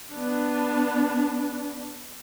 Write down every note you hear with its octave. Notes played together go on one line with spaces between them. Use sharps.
B3 D4